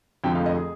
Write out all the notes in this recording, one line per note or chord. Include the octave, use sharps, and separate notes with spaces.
F1 F2 D3 F3 G#3 G5
F5
D#5
G#4